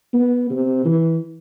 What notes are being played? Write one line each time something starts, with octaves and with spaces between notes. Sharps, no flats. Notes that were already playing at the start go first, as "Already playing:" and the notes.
B3
C3
E3